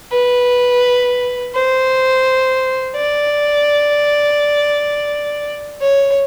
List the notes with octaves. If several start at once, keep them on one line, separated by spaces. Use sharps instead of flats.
B4
C5
D5
C#5